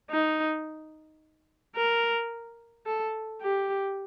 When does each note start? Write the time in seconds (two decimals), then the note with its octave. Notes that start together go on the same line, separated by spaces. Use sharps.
0.10 D#4
1.76 A#4
2.86 A4
3.42 G4